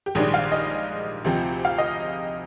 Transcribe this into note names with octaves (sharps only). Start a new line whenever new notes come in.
G4
A#1 G#2 D#3 G3 D4 G#4
F5
D#5
D2 C3 F3 C4
F5
D#5